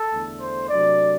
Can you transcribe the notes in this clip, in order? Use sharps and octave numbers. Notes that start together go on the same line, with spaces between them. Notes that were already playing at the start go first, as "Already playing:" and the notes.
Already playing: A4
E2 D3 A3
C5
C3 F#3 A3 D4 D5